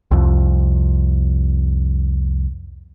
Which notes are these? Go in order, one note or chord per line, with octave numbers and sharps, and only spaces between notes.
C2 F2